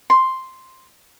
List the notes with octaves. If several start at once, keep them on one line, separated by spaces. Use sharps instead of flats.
C6